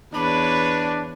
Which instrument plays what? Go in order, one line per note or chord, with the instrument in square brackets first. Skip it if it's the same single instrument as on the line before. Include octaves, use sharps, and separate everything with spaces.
[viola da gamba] E2 B4 C#5 [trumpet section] D4 [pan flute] B5